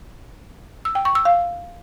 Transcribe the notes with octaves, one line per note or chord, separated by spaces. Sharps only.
E6
G5
C#6
E6
F5